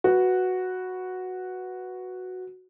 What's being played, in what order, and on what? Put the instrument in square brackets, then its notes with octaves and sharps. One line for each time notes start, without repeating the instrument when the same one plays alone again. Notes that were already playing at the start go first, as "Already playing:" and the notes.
[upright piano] F#4 B4